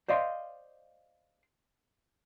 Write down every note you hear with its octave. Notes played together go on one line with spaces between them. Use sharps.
C5 D5 D#5 F5 C6